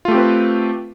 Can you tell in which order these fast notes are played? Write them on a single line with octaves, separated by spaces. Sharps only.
F4 A3 G4 C4 B4